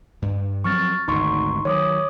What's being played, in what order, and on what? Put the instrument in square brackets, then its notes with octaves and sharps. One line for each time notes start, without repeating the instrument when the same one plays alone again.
[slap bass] G2
[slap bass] F3 F#3 C4 [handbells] C#6 F6 A6
[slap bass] G#1 D2 [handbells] D#4 C6 C#6
[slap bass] D#3 F#3 [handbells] C#5 D6 D#6